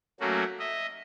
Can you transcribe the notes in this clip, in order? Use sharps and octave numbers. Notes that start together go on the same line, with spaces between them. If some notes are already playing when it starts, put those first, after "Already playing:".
F#3 A3 A#3 C#4 F#4
D#5 E5